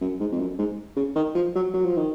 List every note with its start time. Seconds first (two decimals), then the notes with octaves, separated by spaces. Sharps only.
0.01 F#2
0.20 G#2
0.32 F2
0.39 F#2
0.58 G#2
0.96 C#3
1.16 D#3
1.35 F3
1.55 F#3
1.74 F#3
1.85 F3
1.97 D#3